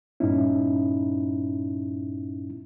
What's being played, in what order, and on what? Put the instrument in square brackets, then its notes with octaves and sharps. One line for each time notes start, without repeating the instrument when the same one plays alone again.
[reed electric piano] G2 A#2 B3 C#4 D#4 E4